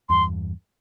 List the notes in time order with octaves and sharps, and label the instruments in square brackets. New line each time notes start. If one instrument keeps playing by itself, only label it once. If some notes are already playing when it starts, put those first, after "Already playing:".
[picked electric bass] E2 G2 [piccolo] C6